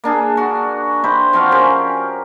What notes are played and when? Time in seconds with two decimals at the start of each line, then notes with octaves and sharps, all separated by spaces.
0.04 A#3 D4 G#4
0.37 F#4
1.04 E4 G4 B4 C5
1.33 F3 C4 F#4 F5
1.52 C#4 G4 A#4